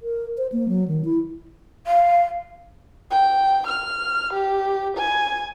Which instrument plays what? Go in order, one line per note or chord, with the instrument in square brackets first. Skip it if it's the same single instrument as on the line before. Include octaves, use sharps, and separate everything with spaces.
[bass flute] A#4
C5
A#3
F#3
D#3
E4
[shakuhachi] F5
[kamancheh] G5
F6
G4
G#5